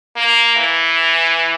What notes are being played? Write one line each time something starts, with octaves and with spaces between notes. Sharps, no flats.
A#3
E3